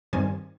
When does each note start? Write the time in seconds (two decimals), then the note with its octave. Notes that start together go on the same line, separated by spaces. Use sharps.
0.13 G2 D#3 G3 C4 G#5